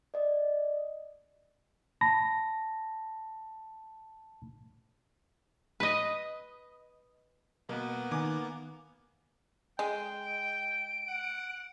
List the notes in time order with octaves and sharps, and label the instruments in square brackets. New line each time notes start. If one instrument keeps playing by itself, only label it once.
[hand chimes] D5 D#5
[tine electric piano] A5 B5 A#6
[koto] B4 D#5
[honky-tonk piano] B2 [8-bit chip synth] A#3 [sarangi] B3
[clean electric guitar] D#3 [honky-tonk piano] G#5 A#5 D6
[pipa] G#3 [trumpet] G5
[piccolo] D7
[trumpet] F#5